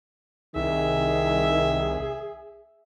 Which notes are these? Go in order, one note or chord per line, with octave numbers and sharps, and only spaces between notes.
C2 D#3 G#4 E5